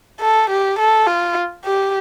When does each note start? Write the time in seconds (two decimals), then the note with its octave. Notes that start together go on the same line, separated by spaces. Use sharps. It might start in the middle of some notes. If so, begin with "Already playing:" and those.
0.20 A4
0.50 G4
0.79 A4
1.06 F4
1.65 G4